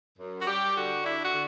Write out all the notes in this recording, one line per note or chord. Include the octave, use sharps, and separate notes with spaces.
F#2
F#4
G3 G4
D3 F#4
D4 E4
F#4
D3